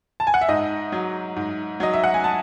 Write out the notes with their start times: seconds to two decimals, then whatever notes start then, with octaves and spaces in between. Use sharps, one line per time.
0.20 A5
0.27 G#5
0.34 F#5
0.41 E5
0.49 G#2 D#5
0.92 F#3
1.37 G#2
1.80 F#3 D#5
1.93 E5
2.04 F#5
2.14 G#5
2.24 A5